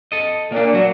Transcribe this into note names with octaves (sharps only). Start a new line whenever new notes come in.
A4 D#5
A#2 A#3 D4
F#3 F#4